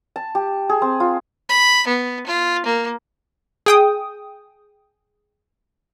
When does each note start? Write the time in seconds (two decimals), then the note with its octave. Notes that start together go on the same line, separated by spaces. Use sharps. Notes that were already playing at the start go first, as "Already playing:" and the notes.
0.16 A5
0.35 G4
0.69 G#4
0.82 C4
1.00 F4
1.49 B5
1.87 B3
2.26 F4
2.66 A#3
3.66 G#4 G5 D#6